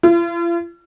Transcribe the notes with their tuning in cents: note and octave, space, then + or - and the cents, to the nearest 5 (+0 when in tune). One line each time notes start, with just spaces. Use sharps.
F4 -45